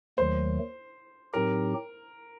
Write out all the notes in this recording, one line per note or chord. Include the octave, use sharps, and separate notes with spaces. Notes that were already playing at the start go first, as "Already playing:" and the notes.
D#2 D#3 F#3 A3 C5
A2 F#3 C4 D#4 G4 A#4